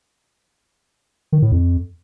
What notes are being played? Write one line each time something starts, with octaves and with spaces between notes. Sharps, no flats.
D#3
A2
F2